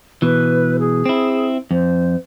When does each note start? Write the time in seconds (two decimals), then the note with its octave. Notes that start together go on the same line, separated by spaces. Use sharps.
0.22 B2 E3 B4
0.79 G#4
1.06 C4 E4
1.71 F2 C5